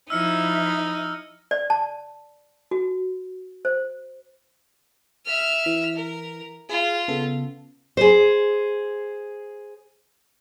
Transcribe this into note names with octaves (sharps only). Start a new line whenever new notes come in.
F3 D#4 E4 E6 F6 C#7
D5
A5
F#4
C5
E5 F6
E3 B6
A#4
F4 G#4
C#3 B3 A4
G#4 C5